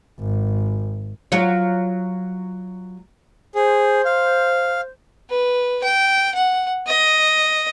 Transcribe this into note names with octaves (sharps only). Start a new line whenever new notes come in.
G#1
F#3 F4 C#5
G#4 C5
F5
B4
G5
F#5
D#5